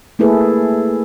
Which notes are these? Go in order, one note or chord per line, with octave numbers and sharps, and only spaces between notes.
A3 A#3 E4 G#4 A4 B4